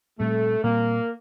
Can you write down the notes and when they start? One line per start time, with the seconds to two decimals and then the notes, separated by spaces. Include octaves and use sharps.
0.20 A#2 G3 A3 C4
0.63 A#2 G3 A#3 C4